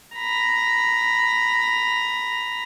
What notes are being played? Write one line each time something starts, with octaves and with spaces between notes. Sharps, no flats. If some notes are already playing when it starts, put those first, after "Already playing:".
A#5 B5